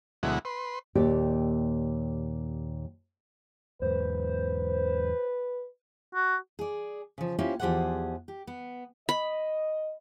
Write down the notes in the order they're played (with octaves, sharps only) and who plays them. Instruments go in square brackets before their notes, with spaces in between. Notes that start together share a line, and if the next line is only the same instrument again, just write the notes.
[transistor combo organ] D2 B2 F#3 G#3 E4 F#5
B4 C6
[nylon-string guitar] D#2 A#2 G4 D5 G5
[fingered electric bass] E2 G#2 [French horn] B4 [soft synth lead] C5
[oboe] F#4
[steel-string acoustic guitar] G#4 D5
C#3 F3
A#3 C#4 E4 F4 G4 C5
E2 F3 G4 G#4 C5 F#5
G4
B3
[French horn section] D#5 [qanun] B5